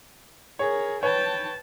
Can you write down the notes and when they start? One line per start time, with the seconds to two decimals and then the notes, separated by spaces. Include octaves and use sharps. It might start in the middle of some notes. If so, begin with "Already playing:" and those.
0.59 G#4 A#4 C#5
1.03 B4 C#5 G5 A5